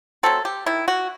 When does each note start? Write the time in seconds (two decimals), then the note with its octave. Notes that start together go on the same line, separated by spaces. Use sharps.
0.23 F#3 A3 C4 A4
0.45 G4
0.66 D#3 E4
0.88 F#4